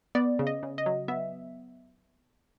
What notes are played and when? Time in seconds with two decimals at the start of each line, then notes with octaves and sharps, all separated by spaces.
0.15 B3 D5
0.39 C#3
0.47 D#5
0.63 C#3
0.78 D#5
0.86 F#3
1.08 B3 E5